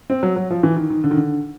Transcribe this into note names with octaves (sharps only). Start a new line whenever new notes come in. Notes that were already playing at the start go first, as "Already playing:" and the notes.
C4
F#3
F#3
F3
E3
D#3
D#3
D3
D#3
D3